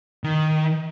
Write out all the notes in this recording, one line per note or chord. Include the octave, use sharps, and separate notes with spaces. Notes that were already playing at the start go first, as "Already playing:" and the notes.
D#3